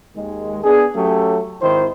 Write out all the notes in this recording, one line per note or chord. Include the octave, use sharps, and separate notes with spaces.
D#2 D#3 G#3
B3 D4 G#4
F#3 A3 C#4 G4 A4
G#1 D#3 E4 C5